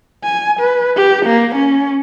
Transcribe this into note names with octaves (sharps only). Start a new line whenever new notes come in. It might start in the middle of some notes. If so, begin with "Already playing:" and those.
G#5
B4
G4
A#3
C#4